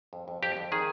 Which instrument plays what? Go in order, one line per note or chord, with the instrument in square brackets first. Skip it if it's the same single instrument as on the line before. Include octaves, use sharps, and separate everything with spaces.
[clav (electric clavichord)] F2
F2
F2 G4
F2
D#3 G#4